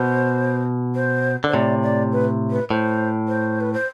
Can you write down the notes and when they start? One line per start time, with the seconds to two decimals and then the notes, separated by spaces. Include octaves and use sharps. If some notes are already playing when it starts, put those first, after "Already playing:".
Already playing: B2 C5
0.95 C5
1.44 D3 C5
1.54 A2 C3 D5
1.83 D5
2.12 B4
2.51 B4
2.70 A2 C5
3.28 C5
3.61 B4
3.73 C5